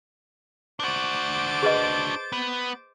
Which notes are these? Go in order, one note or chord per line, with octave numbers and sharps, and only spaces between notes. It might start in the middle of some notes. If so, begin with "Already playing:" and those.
D4 F#4 C5 D6 A6
G#4 B4 D#5
B3